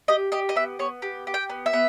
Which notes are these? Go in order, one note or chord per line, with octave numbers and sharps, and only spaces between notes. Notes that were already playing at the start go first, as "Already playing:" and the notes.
G4 D#5
G4 D#5
D#5
B3 E5
B3 C#5
G4
G4
G5
B3
E5
B3